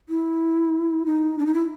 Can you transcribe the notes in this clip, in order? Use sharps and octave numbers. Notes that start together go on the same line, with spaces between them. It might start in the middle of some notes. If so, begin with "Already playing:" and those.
E4
D#4
D4
D#4
E4